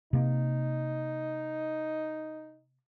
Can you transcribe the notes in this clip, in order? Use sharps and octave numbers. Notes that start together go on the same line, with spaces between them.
C3 A#3 D#4